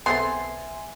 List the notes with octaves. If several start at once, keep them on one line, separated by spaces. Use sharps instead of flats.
B1 B3 C4 A4 E5 G#5 C6